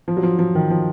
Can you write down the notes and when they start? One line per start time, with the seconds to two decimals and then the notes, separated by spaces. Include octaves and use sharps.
0.08 F3
0.17 F#3
0.23 F3
0.39 F3
0.55 D#3
0.70 F3